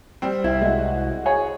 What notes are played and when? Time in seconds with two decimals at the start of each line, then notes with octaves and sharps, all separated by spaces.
0.22 G3 C4
0.44 C2 E4
0.61 G#3 F#4
1.26 G#4 C#5